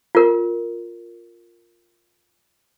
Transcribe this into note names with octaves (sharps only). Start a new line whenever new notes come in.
F4 A#4